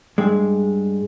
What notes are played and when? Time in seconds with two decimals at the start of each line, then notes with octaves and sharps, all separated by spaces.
0.18 G2 G#3